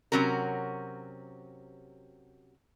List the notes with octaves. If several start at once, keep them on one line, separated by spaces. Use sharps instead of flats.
C3 F#3 C#4 F#4 A#4